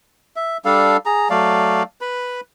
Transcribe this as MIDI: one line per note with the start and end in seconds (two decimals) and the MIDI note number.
0.36 0.57 76
0.65 0.97 55
0.65 0.97 62
0.65 0.97 69
0.65 0.97 77
1.06 1.28 68
1.06 1.28 82
1.30 1.83 54
1.30 1.83 57
1.30 1.83 74
1.30 1.83 77
2.01 2.41 71
2.01 2.41 83